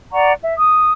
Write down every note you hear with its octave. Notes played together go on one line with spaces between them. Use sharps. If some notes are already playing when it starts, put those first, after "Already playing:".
D5 F#5 A#5 C#6
E5
D#6